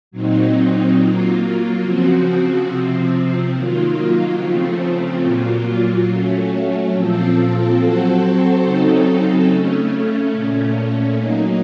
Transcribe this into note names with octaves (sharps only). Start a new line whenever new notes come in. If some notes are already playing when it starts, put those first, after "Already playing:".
A#2 F#3 C4 D#4
F#3 A#3 F4
C#3 F3 C4 F#4
C3 F3 C4
D#3 F#3 A#3 F4
C#3 F3 A3 C4
A#2 F#3 A#3 F4
F#3 A3 C#4
A#2 F3 C4 F4 A4
F#3 C4 F#4 A4 C5
C#3 F#3 C4 D#4 A4
C#3 A3 C#4
A#2 A3 C#4
F#3 A#3 D#4